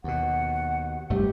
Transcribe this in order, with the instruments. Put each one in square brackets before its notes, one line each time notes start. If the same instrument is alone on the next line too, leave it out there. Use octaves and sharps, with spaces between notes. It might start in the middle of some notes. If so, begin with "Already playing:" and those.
[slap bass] D#2 B2 [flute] F#5
[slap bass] F1 G2 A3 [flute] G4